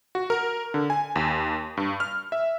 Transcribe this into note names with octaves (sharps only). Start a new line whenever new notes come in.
F#4
A#4
D3
G#5
D#2
G2
F6
E5